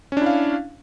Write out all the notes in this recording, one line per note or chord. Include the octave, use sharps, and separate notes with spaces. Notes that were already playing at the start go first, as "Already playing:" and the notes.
C#4 D4 E4 F5